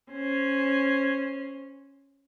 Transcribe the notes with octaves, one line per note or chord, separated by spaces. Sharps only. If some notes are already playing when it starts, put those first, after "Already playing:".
C#4 C5